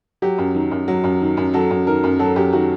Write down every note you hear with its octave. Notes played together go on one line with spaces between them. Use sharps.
F#3 G4
F#2
D#3
F#2
F#3
F#2
D#3
F#2
F#3 A4
F#2
D#3 A#4
F#2
F#3 A4
F#2 G4
D#3 F#4